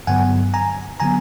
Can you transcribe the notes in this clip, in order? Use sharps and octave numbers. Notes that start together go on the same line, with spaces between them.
G2 D3 F#3 B3 F#5 G#5
G#5 A#5
D3 F#3 B3 G#5 A#5